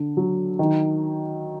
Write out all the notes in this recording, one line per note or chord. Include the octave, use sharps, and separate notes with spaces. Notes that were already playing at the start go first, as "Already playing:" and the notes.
Already playing: D3
F#3
D#3